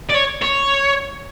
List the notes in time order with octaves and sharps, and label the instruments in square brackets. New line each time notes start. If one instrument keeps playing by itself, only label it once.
[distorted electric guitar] D5
C#5
C#5